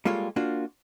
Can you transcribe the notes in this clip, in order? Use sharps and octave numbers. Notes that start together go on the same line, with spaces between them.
G3 G#3 A#3 F4 A4 C#5
A#3 D4 F4 F#4